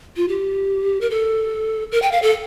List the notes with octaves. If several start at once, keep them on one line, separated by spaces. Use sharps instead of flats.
F4
G4
A#4
A4
A#4
G5
F5
A4